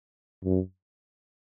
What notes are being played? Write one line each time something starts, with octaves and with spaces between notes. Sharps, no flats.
F#2